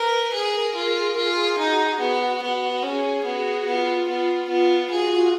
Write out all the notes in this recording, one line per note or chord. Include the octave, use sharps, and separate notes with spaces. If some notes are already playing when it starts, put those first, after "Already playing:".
Already playing: A#4 B4
G#4 A#4
F4 G#4
F4 G#4
D#4 F#4
B3 F#4
B3 F#4
C#4 G#4
B3 F#4
B3 F4
B3 F4
B3
F#4 G#4